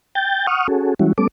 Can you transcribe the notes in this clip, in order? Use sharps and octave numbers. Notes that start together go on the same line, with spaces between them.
G5 G6 A6
F#5 C#6 D#6 F6
C#4 F#4 G#4 A4
E3 G3 G#3 C#4 E4 F#4
G3 A3 B3 C#4 A4 D6